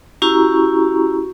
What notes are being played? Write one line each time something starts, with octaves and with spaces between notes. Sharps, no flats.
C#4 E4 F#4 G4 A#5 C#6